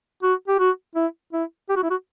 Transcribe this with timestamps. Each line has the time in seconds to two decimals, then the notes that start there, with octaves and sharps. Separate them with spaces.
0.23 F#4
0.48 G4
0.59 F#4
0.95 E4
1.33 E4
1.69 G4
1.76 F#4
1.83 E4
1.90 F#4